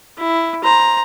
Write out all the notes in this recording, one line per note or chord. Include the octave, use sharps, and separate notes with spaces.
E4
C5 A#5